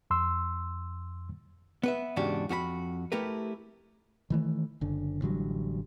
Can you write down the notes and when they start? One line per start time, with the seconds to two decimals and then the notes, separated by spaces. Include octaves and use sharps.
0.10 F2 C6 E6
1.83 B3 B4 E5
2.16 E2 G#2 C#3 D4 F#4 G4
2.49 F2 F#4 G4 B5
3.12 A3 E4 G4 A#4 B4
4.30 D#3 E3 A3
4.81 F#1 D3
5.22 A1 D3 F#3 G3